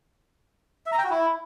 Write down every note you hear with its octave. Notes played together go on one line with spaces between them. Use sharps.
E5
A#5
G5
F#4
E4